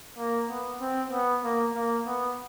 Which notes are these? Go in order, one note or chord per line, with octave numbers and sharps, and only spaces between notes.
A#3
B3
C4
B3
A#3
A#3
B3